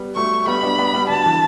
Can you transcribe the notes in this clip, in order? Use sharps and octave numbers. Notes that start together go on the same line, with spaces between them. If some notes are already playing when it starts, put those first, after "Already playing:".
Already playing: G3 B3
F#3 A3 C#6
G3 B3 B5
B3 D4
B3 D4
G3 B3
D3 F#3 A5
E3